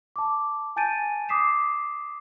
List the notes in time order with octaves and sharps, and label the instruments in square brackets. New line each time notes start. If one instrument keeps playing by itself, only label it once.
[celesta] A5 D6
G#5 A5 G6 A6 D7 D#7
D6 D#6 B6 C7 E7